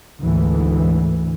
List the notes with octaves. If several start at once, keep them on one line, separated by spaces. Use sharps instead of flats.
D2 G#2 E3